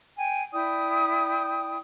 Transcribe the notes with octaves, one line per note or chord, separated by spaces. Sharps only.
G5 G#5
E4 D5 G5 D#6